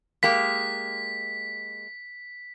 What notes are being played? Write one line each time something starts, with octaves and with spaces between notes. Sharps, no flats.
G#3 A#3 G4 B6